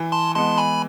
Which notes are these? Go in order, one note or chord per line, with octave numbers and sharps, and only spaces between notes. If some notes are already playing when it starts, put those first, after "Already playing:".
Already playing: E3
A5 C6
G#3 B3 A5 C6
G#5 B5